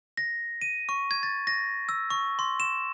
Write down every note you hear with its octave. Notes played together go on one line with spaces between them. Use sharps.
A#6
D#7
C#6
G#6
A6
A#6
E6
C#6
C6
E7